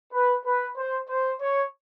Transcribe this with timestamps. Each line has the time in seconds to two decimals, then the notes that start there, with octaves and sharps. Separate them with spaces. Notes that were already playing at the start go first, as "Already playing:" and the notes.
0.13 B4
0.46 B4
0.77 C5
1.10 C5
1.41 C#5